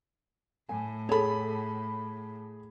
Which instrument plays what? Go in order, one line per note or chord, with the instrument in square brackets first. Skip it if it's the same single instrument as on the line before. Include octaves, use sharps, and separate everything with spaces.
[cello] A2 [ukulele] G#5
[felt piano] G#4 B5 [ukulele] A4 C#5